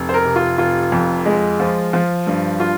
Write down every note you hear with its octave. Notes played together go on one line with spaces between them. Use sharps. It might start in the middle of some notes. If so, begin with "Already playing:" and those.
Already playing: F1
C5
A#4
C3
F4
F1 F4
F2
G#3
F3
F3
G2
F4